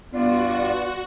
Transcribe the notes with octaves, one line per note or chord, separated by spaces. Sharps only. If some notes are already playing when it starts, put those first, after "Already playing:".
G2 B3 F4 F#4 D5